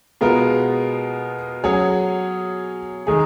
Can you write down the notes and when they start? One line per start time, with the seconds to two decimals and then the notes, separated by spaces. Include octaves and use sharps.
0.21 B2 G#3 B3 F4 A#4
1.64 F#3 C#4 G#4 C#5
3.07 D#3 G#3 D#4 G#4